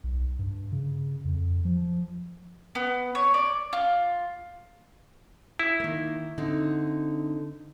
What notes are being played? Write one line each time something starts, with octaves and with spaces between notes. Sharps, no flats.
B1
G2
C#3
F2
F3
B3
C#5
D5
F4
E4
D#3 A#3
D3 C4 D#4